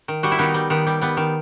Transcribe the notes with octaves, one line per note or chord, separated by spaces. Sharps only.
D#3
G3 F#4
E4
D#3 B3 D#4
G3
D#3 B3
G3
G3 B3
D#3